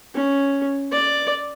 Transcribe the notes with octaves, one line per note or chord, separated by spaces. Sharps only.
C#4
D5